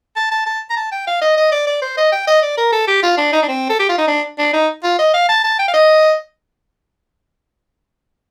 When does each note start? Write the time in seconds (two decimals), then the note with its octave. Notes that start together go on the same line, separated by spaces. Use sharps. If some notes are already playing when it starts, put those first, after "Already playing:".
0.16 A5
0.31 A5
0.46 A5
0.70 A#5
0.77 A5
0.92 G5
1.07 F5
1.22 D#5
1.37 D#5
1.52 D5
1.67 D5
1.82 C5
1.97 D#5
2.12 G5
2.27 D#5
2.42 D5
2.58 A#4
2.73 A4
2.88 G4
3.03 F4
3.17 D4
3.33 D#4
3.43 D4
3.48 C4
3.70 A4
3.80 G4
3.89 F4
3.98 D#4
4.08 D4
4.39 D4
4.53 D#4
4.84 F4
4.99 D#5
5.14 F5
5.29 A5
5.44 A5
5.59 G5
5.68 F5
5.74 D#5